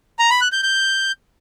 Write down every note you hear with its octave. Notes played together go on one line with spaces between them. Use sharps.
A#5
B5
F#6
G6
G6